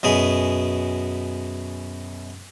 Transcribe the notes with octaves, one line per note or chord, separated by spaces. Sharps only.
F#2 B2 G#4